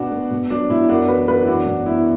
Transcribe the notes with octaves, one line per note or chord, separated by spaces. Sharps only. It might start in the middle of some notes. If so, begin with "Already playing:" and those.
Already playing: B2 B3 D4 F#4
B3
B2
F#3 D4
B2 E4
F#2 D4 F#4
E3 F#4 B4
F#2 F#4 B4
E4
E2 D4 F#4
B2 D4
B3 E4